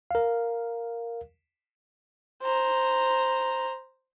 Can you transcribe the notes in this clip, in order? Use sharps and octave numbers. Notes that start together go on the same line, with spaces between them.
A#4 F5
C5 A#5